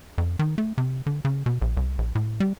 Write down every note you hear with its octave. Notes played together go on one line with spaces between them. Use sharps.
F2
D#3
A3
C3
D3
C#3
B2
A#1
C2
A#1
A2
G3